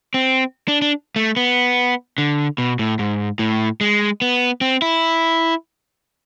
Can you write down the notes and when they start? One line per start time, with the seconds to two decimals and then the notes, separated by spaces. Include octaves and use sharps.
0.14 C4
0.68 D4
0.82 D4
1.16 A3
1.37 B3
2.18 D3
2.58 B2
2.79 A2
2.99 G#2
3.39 A2
3.81 G#3
4.22 B3
4.61 C4
4.82 E4